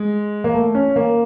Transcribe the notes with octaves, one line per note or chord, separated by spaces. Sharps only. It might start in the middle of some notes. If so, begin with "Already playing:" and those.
Already playing: G#3
A#3
A3
C#4
A#3